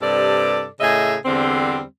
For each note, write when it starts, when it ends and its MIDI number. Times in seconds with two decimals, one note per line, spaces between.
0.01 0.67 43
0.01 0.67 48
0.01 0.67 69
0.01 0.67 74
0.81 1.17 45
0.81 1.17 49
0.81 1.17 68
0.81 1.17 75
0.81 1.17 76
1.25 1.82 40
1.25 1.82 50
1.25 1.82 55
1.25 1.82 60